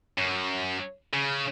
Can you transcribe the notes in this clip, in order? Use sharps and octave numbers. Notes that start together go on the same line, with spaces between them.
F#2
C#3